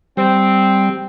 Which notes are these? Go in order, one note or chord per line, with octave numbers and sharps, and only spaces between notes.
G3 C4